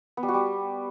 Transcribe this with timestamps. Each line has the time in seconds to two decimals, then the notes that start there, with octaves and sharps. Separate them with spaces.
0.17 B3
0.23 G3
0.28 F#4
0.34 G3